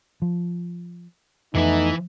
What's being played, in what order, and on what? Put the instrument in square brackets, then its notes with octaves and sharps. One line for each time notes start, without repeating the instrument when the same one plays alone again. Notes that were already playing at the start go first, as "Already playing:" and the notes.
[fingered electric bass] F3
[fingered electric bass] F2 [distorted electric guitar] E3 E5 [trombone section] A3 B3 D#4